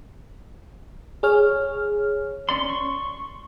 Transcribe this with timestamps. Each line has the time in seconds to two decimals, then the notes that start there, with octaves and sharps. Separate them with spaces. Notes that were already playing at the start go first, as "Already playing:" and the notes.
1.23 G#4 C#5 F6
2.49 C#4 D5 C6
2.69 C#6